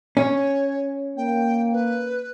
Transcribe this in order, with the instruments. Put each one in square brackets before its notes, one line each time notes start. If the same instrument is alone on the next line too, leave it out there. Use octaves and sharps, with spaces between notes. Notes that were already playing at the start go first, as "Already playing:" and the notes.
[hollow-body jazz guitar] C#4 [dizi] C#5
[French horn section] A#3 [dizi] G5
[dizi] B4